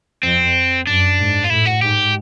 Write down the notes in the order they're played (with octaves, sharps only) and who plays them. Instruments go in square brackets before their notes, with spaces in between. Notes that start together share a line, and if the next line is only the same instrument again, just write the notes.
[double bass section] F2 [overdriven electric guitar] C4
[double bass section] F#2 [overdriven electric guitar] D4
[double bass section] G#2
[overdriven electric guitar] F4
[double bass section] A2 [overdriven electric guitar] E4
[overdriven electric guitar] F#4
[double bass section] G#2 [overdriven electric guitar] G4